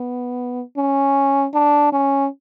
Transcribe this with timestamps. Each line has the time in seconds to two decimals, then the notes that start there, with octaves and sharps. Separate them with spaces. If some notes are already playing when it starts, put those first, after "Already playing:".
Already playing: B3
0.77 C#4
1.54 D4
1.93 C#4